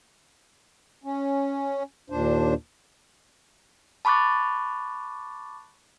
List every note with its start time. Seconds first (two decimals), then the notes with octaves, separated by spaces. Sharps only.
1.04 C#4
2.10 D#2 A#2 D4 C5
4.05 A5 B5 C#6 D6 F#6 A6